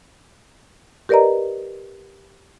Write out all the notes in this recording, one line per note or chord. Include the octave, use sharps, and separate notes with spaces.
G4 A#4 B4 D5 D#5 A#5